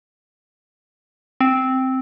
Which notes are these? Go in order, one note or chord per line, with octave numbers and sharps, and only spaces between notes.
C4